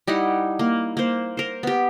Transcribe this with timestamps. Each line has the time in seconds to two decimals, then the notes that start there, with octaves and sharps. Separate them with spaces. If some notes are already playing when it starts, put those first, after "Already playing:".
0.07 G3 D#4 E4 F#5
0.59 A#3
0.97 A#3 C5
1.37 A#4 C5
1.63 B3 G4